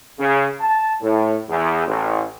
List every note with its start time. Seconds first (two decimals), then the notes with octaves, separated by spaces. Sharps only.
0.19 C#3
0.60 A5
1.02 A2
1.49 E2
1.87 A1